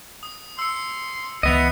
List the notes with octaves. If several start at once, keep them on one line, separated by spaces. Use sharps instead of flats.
D#6
C6 E6 C#7
C#2 E3 B3 D#5 E5 C#7 F7